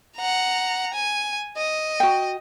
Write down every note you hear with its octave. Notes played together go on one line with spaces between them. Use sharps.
F#5 A#5
G#5
D#5
F#4 G5